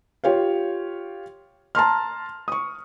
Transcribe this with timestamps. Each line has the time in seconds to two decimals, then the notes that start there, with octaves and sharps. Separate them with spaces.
0.24 F4 G4 C#5 F5
1.75 A5 A#5 C6 F6
2.48 C#6 D#6